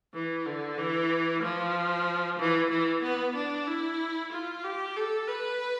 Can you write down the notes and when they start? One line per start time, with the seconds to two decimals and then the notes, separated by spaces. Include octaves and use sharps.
0.14 E3
0.46 D3
0.78 E3
1.43 F3
2.39 E3
2.71 E3
3.03 B3
3.35 D4
3.67 E4
4.32 F4
4.64 G4
4.96 A4
5.28 B4